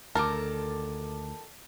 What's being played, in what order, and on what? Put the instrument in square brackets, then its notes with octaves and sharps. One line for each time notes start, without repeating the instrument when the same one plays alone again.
[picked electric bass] D2 [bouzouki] A#2 D#3 A4 [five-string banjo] A#4 [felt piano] A5 D6